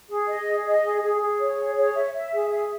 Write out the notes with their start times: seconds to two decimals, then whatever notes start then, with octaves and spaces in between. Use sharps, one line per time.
0.09 G#4
0.28 D#5
0.47 G#4
0.66 D#5
0.84 G#4
1.03 G#4
1.22 G#4
1.40 C#5
1.58 G#4
1.77 C#5
1.95 E5
2.15 E5
2.33 G#4
2.52 E5